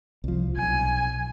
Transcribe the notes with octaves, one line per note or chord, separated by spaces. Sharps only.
C2 F3
B1 G#5